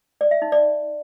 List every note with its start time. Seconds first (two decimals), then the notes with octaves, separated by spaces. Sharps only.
0.21 D5
0.31 E5
0.42 D#4
0.52 D5